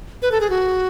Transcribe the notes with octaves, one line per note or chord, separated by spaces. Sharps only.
B4
A4
G#4
F#4